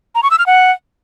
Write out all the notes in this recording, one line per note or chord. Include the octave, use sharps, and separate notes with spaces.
A#5
C#6
E6
F6
F#5